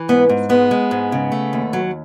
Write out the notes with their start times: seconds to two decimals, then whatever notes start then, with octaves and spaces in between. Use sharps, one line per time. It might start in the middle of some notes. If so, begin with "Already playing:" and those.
Already playing: E3
0.09 G#2 B3
0.29 G#2
0.49 G#3 B3
0.71 G#3
0.91 G#2
1.12 C#3
1.32 A3
1.53 D#2
1.73 F#3